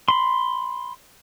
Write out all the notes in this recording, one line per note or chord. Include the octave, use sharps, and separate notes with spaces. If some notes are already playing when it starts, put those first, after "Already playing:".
B5 C6